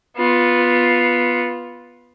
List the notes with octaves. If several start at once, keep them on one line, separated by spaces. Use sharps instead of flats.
B3 F4